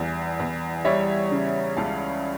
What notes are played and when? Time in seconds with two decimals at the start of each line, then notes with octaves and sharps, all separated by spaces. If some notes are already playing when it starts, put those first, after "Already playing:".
Already playing: E2 E3 G3
0.39 E2
0.85 G3 C#5 E5
1.31 C#3
1.77 C#2 F5 A5